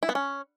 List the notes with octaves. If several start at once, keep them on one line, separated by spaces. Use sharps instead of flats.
E4
B3
C#4